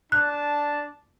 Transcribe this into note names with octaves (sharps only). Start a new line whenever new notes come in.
D4 A5 F#6